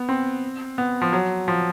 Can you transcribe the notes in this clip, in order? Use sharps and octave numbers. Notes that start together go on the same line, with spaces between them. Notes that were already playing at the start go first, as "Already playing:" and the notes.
Already playing: B3
C4
B3
F3
F#3
F3